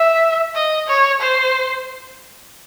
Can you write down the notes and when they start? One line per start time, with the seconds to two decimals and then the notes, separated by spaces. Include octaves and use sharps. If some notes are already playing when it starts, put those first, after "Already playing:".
Already playing: E5
0.55 D#5
0.88 C#5
1.21 C5